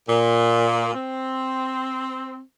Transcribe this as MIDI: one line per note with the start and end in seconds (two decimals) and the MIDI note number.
0.09 0.94 46
0.94 2.41 60